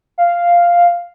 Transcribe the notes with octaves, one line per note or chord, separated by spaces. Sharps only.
F5